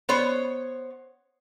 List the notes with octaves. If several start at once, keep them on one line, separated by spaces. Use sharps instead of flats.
B3 C5 C#5